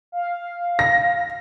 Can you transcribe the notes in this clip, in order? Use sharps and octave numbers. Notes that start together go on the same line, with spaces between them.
F5
A#6